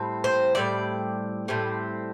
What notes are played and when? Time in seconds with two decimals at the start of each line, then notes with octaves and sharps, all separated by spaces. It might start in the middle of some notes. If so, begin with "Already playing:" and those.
Already playing: A2 G3 C4
0.24 C5
0.55 A2 G3 C4 D5
1.48 A2 G3 C4